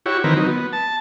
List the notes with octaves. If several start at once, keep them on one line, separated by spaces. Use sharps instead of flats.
E4 F#4 G4 C#5
D#3 E3 C4 A#4 B4
F#3 D#4
B3
A5